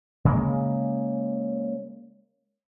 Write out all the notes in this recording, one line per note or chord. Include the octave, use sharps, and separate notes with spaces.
C#3 G#3 A#3